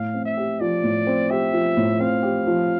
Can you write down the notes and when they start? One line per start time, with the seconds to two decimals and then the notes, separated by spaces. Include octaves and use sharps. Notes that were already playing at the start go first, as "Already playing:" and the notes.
Already playing: A2 F5
0.14 C4
0.26 E5
0.37 G4
0.60 F3 D5
0.83 A2
1.07 C4
1.30 G4 E5
1.53 F3
1.77 A2
2.00 C4 F5
2.23 G4
2.47 F3